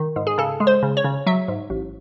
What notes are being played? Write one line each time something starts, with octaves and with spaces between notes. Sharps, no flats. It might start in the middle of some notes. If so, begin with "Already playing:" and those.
Already playing: D#3
G#2
G#4
C#3 A4
G#3
C5
C#3
C#5
C#3
F#3 E5
G#2
A1